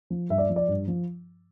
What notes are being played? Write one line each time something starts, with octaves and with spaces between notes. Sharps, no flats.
F3
G2 E5
D5
F3
D5
G2
F3